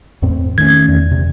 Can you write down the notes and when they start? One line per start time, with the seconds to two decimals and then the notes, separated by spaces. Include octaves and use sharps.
0.22 E2 A2 C4
0.58 D#3 A3 C#4 G#6
0.89 E2
1.11 C3